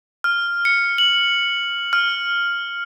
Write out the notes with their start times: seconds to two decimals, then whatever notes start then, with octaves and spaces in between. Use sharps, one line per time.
0.24 F6
0.65 C#7
0.98 F#7
1.93 F6